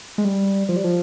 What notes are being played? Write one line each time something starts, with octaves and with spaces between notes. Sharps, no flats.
G#3
G3
F3
G3
F3